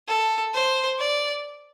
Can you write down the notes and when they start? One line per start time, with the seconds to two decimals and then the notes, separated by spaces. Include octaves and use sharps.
0.08 A4
0.54 C5
0.99 D5